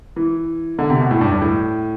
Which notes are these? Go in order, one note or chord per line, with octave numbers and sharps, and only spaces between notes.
E3
D3
C3
B2
A2
G2
G2
A2